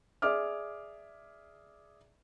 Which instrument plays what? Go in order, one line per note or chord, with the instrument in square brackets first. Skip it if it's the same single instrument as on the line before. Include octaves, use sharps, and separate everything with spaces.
[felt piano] G#4 D5 E5 D6 F6